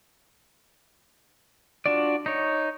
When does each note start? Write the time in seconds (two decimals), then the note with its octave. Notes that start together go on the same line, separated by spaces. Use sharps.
1.86 D4 F4 F#4 D5
2.26 D#4 C#5